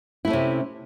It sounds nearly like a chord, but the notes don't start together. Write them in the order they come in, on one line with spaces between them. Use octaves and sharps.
E4 A3 C#4 C3